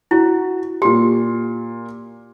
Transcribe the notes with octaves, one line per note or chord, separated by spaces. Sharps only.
E4 F#4
A#2 G4 C6